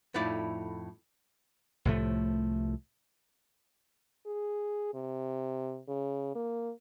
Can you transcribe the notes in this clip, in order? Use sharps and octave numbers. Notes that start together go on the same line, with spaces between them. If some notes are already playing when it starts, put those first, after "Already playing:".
F2 A2 D#4 E4 D5
C2 A2 F3 A3
G#4
C3
C#3
A#3